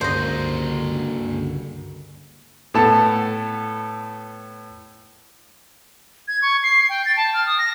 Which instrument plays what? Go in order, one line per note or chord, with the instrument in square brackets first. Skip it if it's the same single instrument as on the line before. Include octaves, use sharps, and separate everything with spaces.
[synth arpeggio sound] C#2 G2 D3 [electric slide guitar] A#3 F#4 A#4 [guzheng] C5 D#5
[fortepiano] A2 B3 A4 A5
[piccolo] G#6
C#6
C7
G5
A6
A5
F6
D#6
A#6